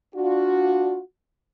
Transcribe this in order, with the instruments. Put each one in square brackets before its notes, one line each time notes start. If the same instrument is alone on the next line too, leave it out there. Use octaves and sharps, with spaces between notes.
[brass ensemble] D4 F4 F#4